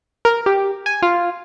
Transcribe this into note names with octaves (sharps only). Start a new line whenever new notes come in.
A#4
G4
G#5
F4